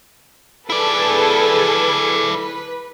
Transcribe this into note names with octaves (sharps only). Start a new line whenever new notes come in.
E4 G#4 A4 B4 D5
B4